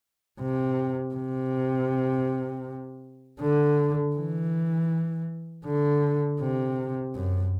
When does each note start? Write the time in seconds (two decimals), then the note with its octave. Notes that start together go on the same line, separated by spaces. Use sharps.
0.40 C3
1.15 C3
3.40 D3
4.16 E3
5.66 D3
6.41 C3
7.16 F#2